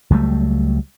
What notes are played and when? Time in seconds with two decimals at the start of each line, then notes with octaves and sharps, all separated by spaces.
0.10 C#2 F#3 G3 A3